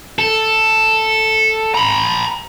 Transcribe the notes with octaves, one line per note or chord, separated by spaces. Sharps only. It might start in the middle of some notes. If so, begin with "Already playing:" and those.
A4
A#5 B5